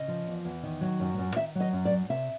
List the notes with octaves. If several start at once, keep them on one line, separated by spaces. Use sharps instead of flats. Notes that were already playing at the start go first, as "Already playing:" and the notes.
Already playing: C#3 D#5
F3
E2
E2
D#3
F#3
F#2
F#2
D#3 E5
F#3
D#5
F#2
D5
F#2
C3 E5